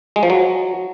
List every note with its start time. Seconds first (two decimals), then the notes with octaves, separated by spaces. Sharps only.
0.16 G#3
0.23 F3
0.30 F#3